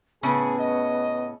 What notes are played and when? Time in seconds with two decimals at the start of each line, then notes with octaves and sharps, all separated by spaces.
0.23 A2 C#3 B3 C#4 G#4
0.59 D#5